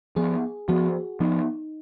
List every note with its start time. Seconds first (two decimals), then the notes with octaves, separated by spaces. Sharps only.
0.16 F3 B3 G#4
0.68 F3 B3 F#4
1.20 F3 B3 D#4